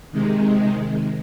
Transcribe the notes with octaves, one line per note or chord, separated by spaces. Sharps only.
C3 D#3 G#3